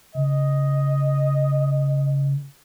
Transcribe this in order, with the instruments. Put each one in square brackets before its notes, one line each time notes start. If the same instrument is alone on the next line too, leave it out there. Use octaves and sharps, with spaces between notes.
[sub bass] C#3 [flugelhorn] D#5